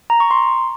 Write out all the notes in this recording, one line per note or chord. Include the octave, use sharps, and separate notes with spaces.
A#5
C#6
C6